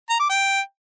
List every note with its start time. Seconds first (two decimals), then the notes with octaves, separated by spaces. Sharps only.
0.10 A#5
0.19 D6
0.29 G5